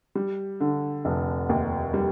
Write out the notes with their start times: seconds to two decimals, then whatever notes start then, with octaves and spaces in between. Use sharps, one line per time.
0.15 G3
0.60 D3
1.05 F1
1.49 D#2
1.94 G3